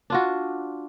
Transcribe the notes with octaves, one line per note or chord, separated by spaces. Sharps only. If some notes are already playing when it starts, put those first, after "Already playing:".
D4 F4 F#4